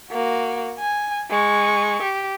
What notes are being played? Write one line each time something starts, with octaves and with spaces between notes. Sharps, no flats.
A#3 F#4
G#5
G#3 C#6
G4